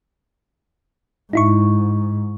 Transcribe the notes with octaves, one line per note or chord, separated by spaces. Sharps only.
G#2 D#4 E4 C#6